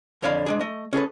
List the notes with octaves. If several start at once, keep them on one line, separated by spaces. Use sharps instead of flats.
F2 D3 C#5 D5 F5 B5
G#3 D4 G#4
A3 D#5
C#4 G#4 A4 B4